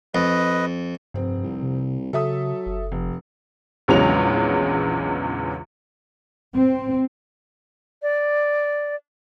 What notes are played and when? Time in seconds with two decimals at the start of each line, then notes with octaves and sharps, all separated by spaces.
0.15 F2 B4 D#5
1.14 F1 G2 C4
1.43 C2
1.63 C3
2.13 C#3 F#3 A4 E5 D#6
2.66 F#1
2.92 F1
3.88 A#1 E2 C#3 F#3 G#3 F7
6.54 C4
8.02 D5